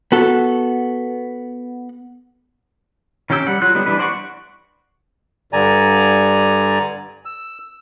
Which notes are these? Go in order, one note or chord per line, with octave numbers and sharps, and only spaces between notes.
B3 F#4 A4
D#3 C#4 G4 G5 E6
G3 F#5
F#3 F4 F#6
D3 G3 B3 D#4
E3 G3 D4 B4
C5 D5 F#5 A5 C#6
G2 D3 D5 G#5 A#5
E6